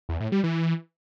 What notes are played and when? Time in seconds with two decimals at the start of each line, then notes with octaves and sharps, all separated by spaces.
0.09 E2
0.20 A2
0.32 G3
0.44 E3